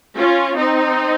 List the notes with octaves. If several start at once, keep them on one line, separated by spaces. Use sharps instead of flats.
C#4 F4
C4 D#4